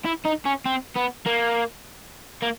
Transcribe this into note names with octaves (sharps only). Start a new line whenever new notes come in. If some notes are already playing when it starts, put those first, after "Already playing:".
E4
D#4
C#4
C4
B3
A#3
A#3